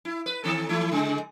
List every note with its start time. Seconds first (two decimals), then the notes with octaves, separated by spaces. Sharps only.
0.05 E4
0.26 B4
0.44 D#3 C4 A4
0.69 E3 A3 E4
0.91 C#3 G#3